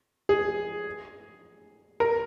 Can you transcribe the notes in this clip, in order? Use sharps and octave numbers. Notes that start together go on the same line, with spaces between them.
G#4
A#4